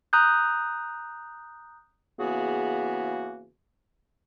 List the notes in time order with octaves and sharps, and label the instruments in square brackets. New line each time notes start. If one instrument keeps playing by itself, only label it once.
[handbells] A#5 D#6 F#6 G6
[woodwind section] C#3 E3 A#3 B3 F#4 G#4